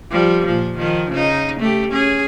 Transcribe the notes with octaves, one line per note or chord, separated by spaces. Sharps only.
F3 G3
A#2 F3
D#3 F3
C#3 D#4
A3 G4
C#4 G#4